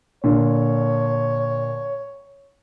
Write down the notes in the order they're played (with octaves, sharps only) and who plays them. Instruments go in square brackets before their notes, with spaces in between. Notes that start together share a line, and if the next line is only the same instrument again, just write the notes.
[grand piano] A#2 D3 [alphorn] C#5